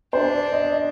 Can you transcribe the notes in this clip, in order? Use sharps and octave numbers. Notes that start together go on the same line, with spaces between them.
D4 C5
D5
D#5
D#5